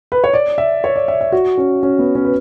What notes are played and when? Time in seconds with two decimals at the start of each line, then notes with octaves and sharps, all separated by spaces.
0.12 B4
0.24 C#5
0.33 D5
0.58 E5
0.84 C#5
0.96 D5
1.08 E5
1.21 E5
1.32 F#4
1.58 C#4
1.83 C#4
1.99 B3
2.15 C#4
2.25 B4